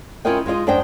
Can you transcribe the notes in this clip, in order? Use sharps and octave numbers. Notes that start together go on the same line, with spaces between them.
C#4 E4 F4 A#4 D#5 G5
G#3 D#4 F4 D#5
F#2 D4 C5 D#5 G5